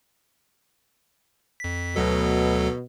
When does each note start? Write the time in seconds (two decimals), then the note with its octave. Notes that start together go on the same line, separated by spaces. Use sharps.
1.60 F2 B6
1.96 D2 B2 F#3 A4